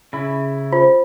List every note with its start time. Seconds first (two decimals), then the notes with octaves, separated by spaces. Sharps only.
0.13 C#3 E4
0.72 F4 C5